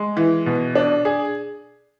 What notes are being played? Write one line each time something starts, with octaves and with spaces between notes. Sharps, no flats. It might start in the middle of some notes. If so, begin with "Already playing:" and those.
Already playing: G#3
E3
B2
D4
G#4